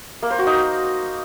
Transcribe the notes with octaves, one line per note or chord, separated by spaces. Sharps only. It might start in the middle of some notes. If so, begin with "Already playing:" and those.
A#3
C5
F#4
D#4